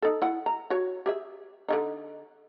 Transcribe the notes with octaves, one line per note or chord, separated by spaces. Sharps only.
D#4 A4
E4 F#5
A#5
F#4 C#5
G4 G#4 E5
D3 D#3 D#4